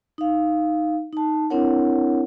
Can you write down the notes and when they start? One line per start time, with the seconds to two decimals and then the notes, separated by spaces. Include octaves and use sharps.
0.18 D#4 F5
1.13 D#4 A5
1.50 C4 D4 E4 A#4 C#5 F#5